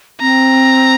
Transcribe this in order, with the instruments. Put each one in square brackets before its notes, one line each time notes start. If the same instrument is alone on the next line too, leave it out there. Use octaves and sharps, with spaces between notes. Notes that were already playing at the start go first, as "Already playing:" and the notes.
[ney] C4 [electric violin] A#5